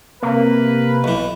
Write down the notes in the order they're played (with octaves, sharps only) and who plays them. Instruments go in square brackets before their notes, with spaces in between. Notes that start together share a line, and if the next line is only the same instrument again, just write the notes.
[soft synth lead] C3 [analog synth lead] A#3 [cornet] B4
[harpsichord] B1 E3